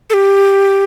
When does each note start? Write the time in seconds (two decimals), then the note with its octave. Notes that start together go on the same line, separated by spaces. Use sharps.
0.10 A4
0.14 G4